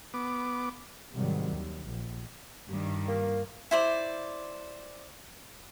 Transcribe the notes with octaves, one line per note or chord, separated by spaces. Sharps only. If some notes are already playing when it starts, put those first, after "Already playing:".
B3 D6
G#2 C3 D#3 F#3 G3
D#2
A#1
G2 D#3 G3
A#3
E4 C5 D5